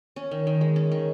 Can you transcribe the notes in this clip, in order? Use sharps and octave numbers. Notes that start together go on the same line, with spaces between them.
C#4
D#3
D#3
G#3
C#4
D#3